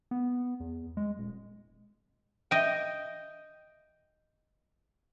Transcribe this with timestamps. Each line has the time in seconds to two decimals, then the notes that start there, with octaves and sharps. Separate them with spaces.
0.11 B3
0.60 E2
0.97 G#3
1.18 D#1
2.51 D#5 G5